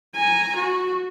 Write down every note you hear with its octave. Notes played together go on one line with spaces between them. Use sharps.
G#5 A#5
F#4